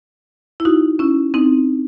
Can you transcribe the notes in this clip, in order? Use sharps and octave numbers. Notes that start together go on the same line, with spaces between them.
E4
D#4 F#4
C#4 E4
C4 D#4